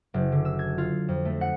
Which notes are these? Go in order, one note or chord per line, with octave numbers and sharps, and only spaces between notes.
F#1
D3
E6
G#6
F4
F2
A3
F#5